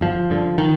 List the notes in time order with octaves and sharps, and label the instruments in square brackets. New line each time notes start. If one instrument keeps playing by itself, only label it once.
[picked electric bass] G1 F3
G2 D3
D#3